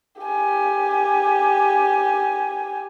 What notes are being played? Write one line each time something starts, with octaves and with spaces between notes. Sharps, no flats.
G4 G#5